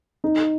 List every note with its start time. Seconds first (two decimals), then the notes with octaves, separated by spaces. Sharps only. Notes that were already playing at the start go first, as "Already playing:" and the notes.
0.24 D#4